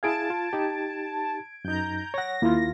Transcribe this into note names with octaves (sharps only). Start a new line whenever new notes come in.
E4 G#4 F5 A5 G#6 D7
F4
D#4 G4
F#2 D#4 A#5 G6
C#5 F#5 A#6
D#2 A#3 E4 F4